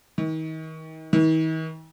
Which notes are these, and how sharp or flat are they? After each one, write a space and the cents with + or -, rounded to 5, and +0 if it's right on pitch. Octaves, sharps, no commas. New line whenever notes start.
D#3 +35
D#3 +45